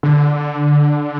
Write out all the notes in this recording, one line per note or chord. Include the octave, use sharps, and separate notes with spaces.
D3